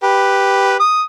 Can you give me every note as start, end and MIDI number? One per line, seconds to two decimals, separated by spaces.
0.03 0.76 67
0.03 0.76 71
0.80 1.02 87